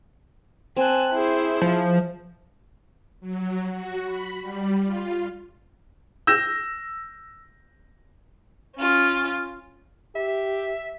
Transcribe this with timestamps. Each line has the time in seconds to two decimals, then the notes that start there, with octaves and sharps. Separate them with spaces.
0.77 C4 G#5 A5 F#6
1.12 E4 G#4 C5
1.61 F3
3.20 F#3
3.75 F#4
4.05 B5
4.41 G3
4.83 F4
6.27 E6 G6 A#6 E7
8.77 C#4 F4
10.15 G4 E5